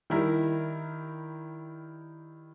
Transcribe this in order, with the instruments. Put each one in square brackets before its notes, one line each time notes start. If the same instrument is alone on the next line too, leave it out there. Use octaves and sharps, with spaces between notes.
[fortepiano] D#3 G3 E4 A#4